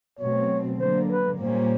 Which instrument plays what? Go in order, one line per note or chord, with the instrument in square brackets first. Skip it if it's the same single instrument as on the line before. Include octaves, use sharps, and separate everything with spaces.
[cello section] B2 F#3 A3 C4 [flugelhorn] C#5
[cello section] D3 F#3 A#3 [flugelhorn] C5
[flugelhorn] B4
[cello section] A#2 G3 A#3 C#4 [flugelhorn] C5